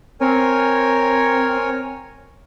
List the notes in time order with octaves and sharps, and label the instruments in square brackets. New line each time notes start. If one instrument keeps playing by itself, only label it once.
[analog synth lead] C4 [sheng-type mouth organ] A#4 C#5 G#5